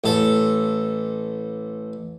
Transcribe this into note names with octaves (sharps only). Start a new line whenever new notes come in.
A1 A4